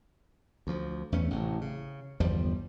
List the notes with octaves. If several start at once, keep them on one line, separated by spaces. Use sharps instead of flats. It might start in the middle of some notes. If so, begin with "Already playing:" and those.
D2 F3
E2 A3 C#4
A1 A2 C3
C#3
G1 E2 F3 G3